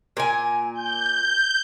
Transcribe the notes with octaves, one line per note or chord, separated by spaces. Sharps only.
A#2 A#4 G#5
G6